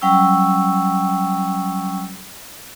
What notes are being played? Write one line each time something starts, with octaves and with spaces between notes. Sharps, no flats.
F#3 G3 C#4 G5 C#6 E6